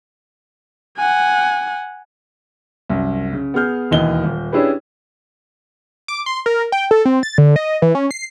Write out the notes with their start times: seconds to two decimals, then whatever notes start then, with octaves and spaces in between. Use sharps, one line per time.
0.97 F#5 G#5
2.90 C2 F#2
3.33 C#3
3.54 B3 G#4 F6 G6
3.91 E1 D#2 E3 D#5 G7
4.24 D#1
4.52 C#4 D4 E4 G4 G#4 B4
6.08 D6
6.26 C6
6.46 A#4
6.72 G5
6.91 A4
7.05 C4
7.23 A6
7.38 D3
7.56 D#5
7.82 E3
7.95 C#4
8.11 C7